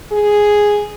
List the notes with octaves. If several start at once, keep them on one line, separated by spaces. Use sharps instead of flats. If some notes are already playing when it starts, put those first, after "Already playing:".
G#4